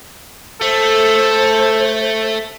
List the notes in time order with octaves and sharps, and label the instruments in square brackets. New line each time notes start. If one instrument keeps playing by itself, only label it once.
[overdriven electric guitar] A3 [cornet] A4 [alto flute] C5